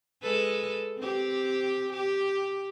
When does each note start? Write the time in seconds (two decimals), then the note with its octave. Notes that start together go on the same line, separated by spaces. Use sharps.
0.23 G#3 A4 B4
0.98 C4 G4
1.93 G4